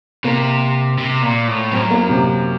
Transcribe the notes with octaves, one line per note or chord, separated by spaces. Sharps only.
C3 A#3
C3
A#2
A2
F#2 C4
A#3
C3